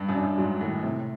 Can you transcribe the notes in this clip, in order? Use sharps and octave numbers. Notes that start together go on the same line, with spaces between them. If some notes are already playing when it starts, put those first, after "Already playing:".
Already playing: G2
F#2
D4
F#2
G#2 F#3
A2 D#3
A2 C3